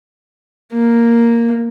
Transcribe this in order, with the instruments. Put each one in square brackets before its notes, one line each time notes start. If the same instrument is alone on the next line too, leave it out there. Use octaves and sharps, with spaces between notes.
[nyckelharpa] A#3